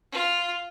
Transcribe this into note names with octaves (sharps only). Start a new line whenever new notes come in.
F4